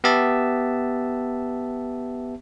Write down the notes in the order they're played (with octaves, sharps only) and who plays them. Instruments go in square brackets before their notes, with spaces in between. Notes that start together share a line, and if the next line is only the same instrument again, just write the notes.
[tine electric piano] B3 G4 E5 A5